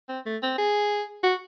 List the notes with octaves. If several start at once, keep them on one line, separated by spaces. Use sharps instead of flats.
C4
A3
C4
G#4
F#4